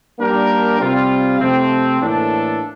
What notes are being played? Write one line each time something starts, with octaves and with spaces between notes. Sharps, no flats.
G3 A#3 D4 G4 A#4
C3 G3 C4 F4
C3 F3 A3 C4
A2 E3 A#3 D4 A4